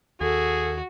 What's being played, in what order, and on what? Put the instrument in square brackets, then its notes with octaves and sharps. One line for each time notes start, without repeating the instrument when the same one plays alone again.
[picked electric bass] D#2 [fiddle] F#4 [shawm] G#4 [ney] A4